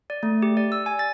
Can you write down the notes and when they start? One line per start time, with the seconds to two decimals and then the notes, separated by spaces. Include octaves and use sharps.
0.10 D5
0.23 A3
0.42 G4
0.57 D5
0.72 E6
0.86 G#5
0.99 A6